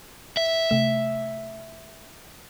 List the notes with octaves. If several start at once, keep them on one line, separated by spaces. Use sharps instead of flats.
E5
C3 A3 E7